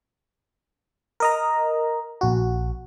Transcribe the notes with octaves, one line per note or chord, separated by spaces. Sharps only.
A#4 D#5 A#5
A#1 F#4